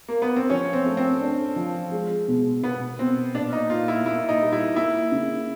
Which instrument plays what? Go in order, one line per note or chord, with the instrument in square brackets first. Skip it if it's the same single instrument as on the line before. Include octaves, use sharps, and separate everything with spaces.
[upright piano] A#3
B3
C4
[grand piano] F3 [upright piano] C#4
[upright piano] C4
[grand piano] A3
[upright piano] C4
[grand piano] D4
F3
G#3
B2
[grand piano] B2 [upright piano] B3
[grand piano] B2 [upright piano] C4
[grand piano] A#2 [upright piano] D4
[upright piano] D#4
[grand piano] A#2 [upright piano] F4
[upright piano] E4
[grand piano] A#2 [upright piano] E4
[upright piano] D#4
[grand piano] G3
[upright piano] E4
[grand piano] A#3 [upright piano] E4
[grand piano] C#3